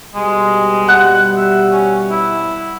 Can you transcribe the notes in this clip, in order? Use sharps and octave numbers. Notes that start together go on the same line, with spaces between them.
B2 G3 G#3
F#5 F#6
E5
C#4
E4